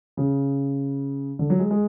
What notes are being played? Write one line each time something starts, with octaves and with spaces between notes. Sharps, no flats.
C#3
D3
F#3
G#3
G#3